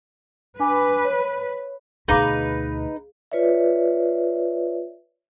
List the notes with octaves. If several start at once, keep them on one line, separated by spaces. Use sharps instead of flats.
D4 B4 G#5 D6
C#5
D2 B2 D#4 G#4 B4 F5 D6
F4 B4 C#5 D5 E5